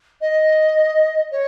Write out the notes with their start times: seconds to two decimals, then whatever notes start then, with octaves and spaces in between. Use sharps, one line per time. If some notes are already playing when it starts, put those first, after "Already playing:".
0.21 D#5
1.32 C#5